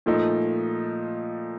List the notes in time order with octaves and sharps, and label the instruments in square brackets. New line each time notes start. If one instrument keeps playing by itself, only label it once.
[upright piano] A#2 F3 A3 D#4